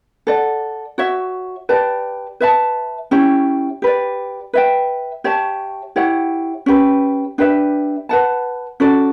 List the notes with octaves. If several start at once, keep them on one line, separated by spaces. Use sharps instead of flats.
A4 D5 F#5
F#4 C#5 E5
G4 B4 D5 A5
B4 E5 A5
C#4 E4 G4 C#5
G4 B4 D5
B4 E5 G5
G4 C#5 E5 A5
E4 G4 C#5 F#5
C#4 G4 B4
D4 G4 B4 E5
B4 F#5 A5
C#4 F#4 A4 D5